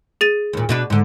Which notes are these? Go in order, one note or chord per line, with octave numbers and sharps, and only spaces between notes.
G#4 A6 D#7
D#2 A#2
B2 D4 B4
G#2 D3